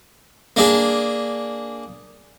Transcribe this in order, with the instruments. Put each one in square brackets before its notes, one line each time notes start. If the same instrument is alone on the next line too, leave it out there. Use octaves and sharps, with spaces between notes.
[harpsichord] A#3 D4 G#4